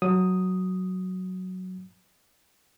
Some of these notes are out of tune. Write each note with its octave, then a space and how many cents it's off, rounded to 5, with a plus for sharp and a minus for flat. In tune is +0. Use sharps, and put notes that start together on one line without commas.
F#3 +0 D#6 +0